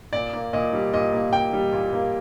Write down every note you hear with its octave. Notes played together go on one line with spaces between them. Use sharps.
A#2 D5
A#3
A#2 D#5
G3
A#2 D#5
A#3
A#2 G5
G3
A#2
A#3